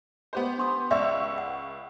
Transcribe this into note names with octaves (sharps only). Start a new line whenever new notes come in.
B3 G4 C5
D4 C6 D#6
C#2 D5 E5 F5 C#6 E6
F#5